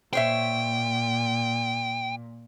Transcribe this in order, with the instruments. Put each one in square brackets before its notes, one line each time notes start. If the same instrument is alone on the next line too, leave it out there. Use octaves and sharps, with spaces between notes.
[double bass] A#2 [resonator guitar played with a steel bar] C5 C#5 E5 [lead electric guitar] G5